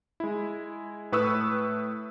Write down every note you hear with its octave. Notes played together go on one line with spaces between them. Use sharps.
G#3 E4
A2 A3 B4 C#6 D#6 E6